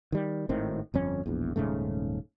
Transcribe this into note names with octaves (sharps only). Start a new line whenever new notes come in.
D#3 G3
G#1 A2 D#3 C4
G1 F2 C#4
E1 A#1 E2
D#1 G#2 C#3 A3